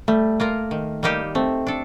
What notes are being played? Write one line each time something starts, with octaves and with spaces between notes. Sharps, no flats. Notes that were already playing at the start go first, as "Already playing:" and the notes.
G3 A3
A#3 F4 A#4
D#3
G3 A#3 D#4 G4
A3 C4
D4 A4